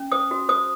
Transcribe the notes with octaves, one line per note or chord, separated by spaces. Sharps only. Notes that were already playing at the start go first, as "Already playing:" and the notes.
Already playing: C#4
C5 D#6
F#4
C5 D#6